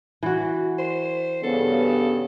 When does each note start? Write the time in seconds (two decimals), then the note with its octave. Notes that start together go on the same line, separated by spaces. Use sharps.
0.23 E3 F#4
0.78 C5
1.43 G2 C#3 B3 A4